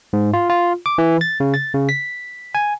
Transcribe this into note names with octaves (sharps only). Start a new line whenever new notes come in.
G#2
F4
F4
D6
E3
A6
C#3
A6
C#3
B6
G#5